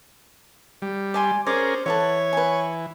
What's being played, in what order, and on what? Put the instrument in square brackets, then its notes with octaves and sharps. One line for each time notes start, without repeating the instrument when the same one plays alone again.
[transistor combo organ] G3
[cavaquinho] D5 G#5 C6
[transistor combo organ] C#4 G#4 A#4 [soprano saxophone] C5 [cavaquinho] D5
[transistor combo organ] E3 [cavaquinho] A4 B4 F#5 [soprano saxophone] C#5
[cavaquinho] B4 G#5